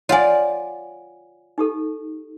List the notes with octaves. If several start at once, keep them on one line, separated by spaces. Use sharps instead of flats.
F4 C#5 D5 F#5 G#5
D#4 G4 A4